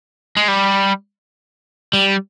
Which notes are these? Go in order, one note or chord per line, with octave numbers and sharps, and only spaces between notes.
G#3
G3
G3